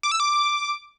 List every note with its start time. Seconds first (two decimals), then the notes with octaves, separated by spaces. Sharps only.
0.03 D6
0.11 E6
0.20 D6